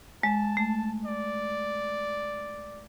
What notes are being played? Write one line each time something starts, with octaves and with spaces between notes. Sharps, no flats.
G#3 A5
A3
D5